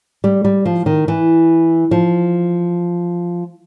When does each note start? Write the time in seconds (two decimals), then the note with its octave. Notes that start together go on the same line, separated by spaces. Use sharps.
0.24 G3
0.44 G3
0.65 F3
0.86 D#3
1.08 E3
1.91 F3